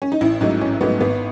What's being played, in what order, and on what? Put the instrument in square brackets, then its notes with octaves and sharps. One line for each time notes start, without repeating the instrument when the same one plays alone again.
[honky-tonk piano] C#4
D#4
A1 E4
G#2 F#3 A3 D#4
A1 C#4
G#2 F#3 A3 B3
G#1 B3